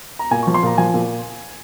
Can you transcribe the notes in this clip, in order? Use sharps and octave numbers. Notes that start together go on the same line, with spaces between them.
A#5
A#2 G#5
F3 C#6
C6
A#2 A#5
F3 G#5
A#2